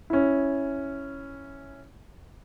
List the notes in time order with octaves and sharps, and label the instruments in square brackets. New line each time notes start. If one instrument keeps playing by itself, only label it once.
[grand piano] C#4 E4